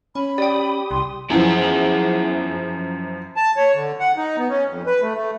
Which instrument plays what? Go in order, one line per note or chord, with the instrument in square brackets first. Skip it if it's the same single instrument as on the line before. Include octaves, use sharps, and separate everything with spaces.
[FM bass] C#4 [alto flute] B5
[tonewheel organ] G4 D#6 [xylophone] D5 G5
[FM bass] C2 [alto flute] C6
[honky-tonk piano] F#2 E3 F3 [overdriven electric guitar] E4 G#4
[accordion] A5
C#5
D3
F#5
D#4
B3
C#4
F2
B4
A3
A3